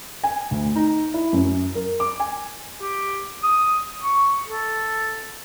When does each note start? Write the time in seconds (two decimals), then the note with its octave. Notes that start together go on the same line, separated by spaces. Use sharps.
0.24 G#5
0.51 D2
0.76 D#4
1.14 E4
1.33 F#2
1.75 A#4
2.00 D6
2.20 G#5
2.81 G4
3.43 D#6
4.03 C#6
4.48 A4